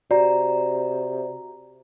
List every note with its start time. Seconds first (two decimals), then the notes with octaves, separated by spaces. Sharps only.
0.11 C3 F#4 D5 A#5